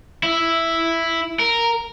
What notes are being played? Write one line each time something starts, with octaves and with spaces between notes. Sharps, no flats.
E4
A#4